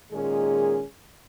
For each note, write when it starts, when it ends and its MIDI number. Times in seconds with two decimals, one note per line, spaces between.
0.13 0.83 46
0.13 0.83 51
0.13 0.83 56
0.13 0.83 61
0.13 0.83 68